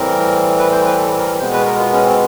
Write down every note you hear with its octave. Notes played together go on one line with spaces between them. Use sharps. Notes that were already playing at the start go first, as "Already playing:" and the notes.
Already playing: A2 E3 G3 C4 A#4
B4
C5
B4
A4
A#4
B2 G#3 B3 C5
B4
A#4
F4
C#4
C4